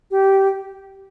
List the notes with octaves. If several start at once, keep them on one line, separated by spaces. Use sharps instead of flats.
G4